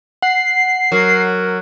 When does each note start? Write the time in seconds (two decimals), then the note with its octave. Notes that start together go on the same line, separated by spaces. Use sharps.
0.22 F#5 C7
0.92 F#3 A#4